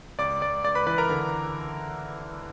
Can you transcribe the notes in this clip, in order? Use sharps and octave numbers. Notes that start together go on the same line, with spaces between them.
C#2 D5 D6
C#2 D5 D6
C#2 D5 D6
B4 B5
E3 B4 B5
A#4 A#5
D3